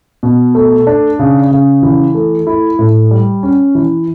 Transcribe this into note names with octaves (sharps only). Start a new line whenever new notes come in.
B2
A3
D4
C#3
C#3
E3
A3
E4
A2
G3
C#4
E3